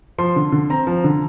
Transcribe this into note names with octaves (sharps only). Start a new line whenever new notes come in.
F3 C6
D3
D3
C4 A#5
F3
D3